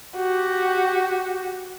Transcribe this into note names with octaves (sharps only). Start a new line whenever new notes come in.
F#4 G4